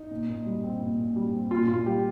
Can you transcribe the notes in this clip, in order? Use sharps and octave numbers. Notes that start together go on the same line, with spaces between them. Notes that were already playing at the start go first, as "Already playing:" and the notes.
Already playing: D#4
A#2
A#2
G3
C4
A#2
A#2
G3
C4
A#2 F4
A#2 F4
G3 G4